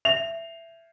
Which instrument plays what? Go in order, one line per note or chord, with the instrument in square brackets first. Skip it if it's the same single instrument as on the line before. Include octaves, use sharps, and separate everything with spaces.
[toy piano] E5 [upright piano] F7